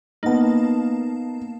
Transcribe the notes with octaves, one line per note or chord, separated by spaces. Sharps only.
A#3 B3 D#4 A5